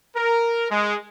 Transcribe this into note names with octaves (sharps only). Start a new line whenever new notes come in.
A#4
G#3